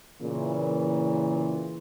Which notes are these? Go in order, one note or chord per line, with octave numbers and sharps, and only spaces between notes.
A#2 C#3 E3